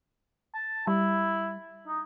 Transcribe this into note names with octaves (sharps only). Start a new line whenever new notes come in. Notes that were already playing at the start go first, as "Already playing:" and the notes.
A5
G3 E4
D#4